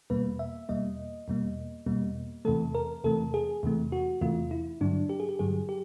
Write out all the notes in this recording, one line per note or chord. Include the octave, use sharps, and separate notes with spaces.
E2 B2 G3 A#3 B4
E5
E2 B2 G3 A#3 D#5
E2 B2 G3 A#3
E2 B2 G3 A#3
E2 C3 E3 A3 A4
A#4
E2 C3 E3 A3 A4
G#4
E2 C3 E3 A3
F#4
E2 C3 E3 A3 F4
E4
G2 D3 F#3 D4
G4
G#4
G4
G2 D3 F#3 G#4
G4